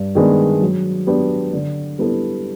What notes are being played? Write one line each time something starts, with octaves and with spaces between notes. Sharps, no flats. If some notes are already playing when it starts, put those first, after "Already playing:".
Already playing: G2
D#3 G#3 B3 D4
F#3
B3 D4 G4
D3
G3 B3 E4 A4